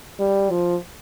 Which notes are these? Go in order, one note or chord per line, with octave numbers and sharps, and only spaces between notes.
G3
F3